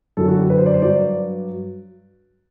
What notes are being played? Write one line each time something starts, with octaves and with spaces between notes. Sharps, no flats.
F#2 D3 F#3 A4
F#4
G4
B4
C5
D5
C5
G2 F#3 D5